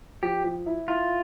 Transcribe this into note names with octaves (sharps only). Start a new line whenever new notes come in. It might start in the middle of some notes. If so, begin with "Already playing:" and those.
F3 G4
F3
E4
E4 F4